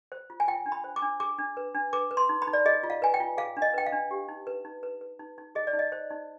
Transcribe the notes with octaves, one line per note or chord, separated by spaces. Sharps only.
C5
F4
G#5
F4 G5
D4
B5
C5
D6
D4
G#4 D6
D4
B4
D4
B4 D6
B4
C6
D#4
B5
D#4
D5
G#4 D#5
F4
F5
B4 G#5
G5
F4
G#4 F5
D4
D#5
B4 G5
F5
D4
G4
D#4
B4
D#4
B4
B4
D#4
D#4
G#4 D#5
D5
D#4
D#5
C5
D#4